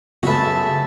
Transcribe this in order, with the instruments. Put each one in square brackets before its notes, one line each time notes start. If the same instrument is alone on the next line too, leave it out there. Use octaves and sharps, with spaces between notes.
[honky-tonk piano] F#2 G#3 A3 [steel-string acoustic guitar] C#3 [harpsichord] F#4 B4 [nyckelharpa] E5 A5